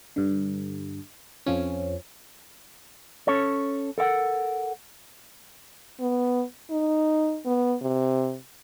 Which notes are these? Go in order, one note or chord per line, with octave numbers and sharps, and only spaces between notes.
G2 D3
F2 F3 C#4
C#4 A4 C#5
A4 A#4 F5 F#5
B3
D#4
B3
C3